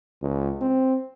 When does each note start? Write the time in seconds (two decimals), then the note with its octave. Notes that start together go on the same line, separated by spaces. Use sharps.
0.22 C#2
0.61 C4